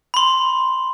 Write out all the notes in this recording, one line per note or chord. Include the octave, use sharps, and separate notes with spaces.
B5 C6